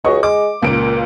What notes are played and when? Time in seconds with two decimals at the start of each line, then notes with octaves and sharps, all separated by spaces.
0.04 C#2 F#4 D#5 C#6
0.23 G#3 D6
0.63 C#2 A#2 A#3 D7